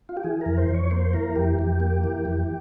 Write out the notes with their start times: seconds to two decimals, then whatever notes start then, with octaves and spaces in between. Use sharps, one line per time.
0.09 F4
0.17 G4
0.24 E3 G#4
0.41 F2 A#4
0.57 C5
0.69 F2
0.74 C#5
0.91 A#3 C5
1.13 E3 A#4
1.35 F2 G4
1.59 F2
1.80 A#3
2.04 E3
2.25 F2